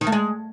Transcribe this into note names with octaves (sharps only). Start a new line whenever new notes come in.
D#3
A3
G#3